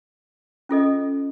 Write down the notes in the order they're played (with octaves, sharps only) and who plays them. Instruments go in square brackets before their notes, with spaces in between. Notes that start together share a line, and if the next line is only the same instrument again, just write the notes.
[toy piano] C#4 F4 A4 D#5